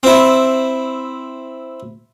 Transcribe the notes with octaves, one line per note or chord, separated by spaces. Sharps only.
C4 E4